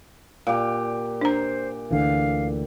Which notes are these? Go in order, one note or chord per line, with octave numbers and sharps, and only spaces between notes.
A#2 G4 F5
D4 C5 A#5
D2 D3 E3 F5